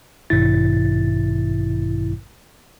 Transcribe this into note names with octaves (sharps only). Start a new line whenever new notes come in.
A1 G2 B2 D#3 E4 A6